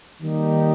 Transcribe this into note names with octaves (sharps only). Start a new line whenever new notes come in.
D#3 G3 A#3 D#4 G4